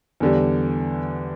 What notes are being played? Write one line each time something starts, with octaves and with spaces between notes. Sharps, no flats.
E2 D3 G3